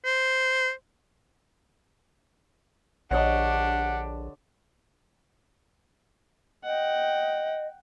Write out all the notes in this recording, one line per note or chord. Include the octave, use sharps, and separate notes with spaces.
C5
A#1 D3 D4 G4 C#5 D#5 F#5
D#5 F#5 G5